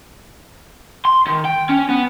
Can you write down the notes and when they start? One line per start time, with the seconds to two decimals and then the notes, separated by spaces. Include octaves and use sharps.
1.05 C6
1.27 D#3
1.45 G5
1.70 C#4
1.90 B3